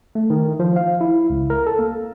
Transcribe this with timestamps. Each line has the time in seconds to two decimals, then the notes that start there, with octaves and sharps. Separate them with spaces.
0.15 A3
0.30 D#3
0.60 F3
0.76 F5
1.01 E4
1.30 C#2
1.50 A#4
1.67 A4
1.79 A#3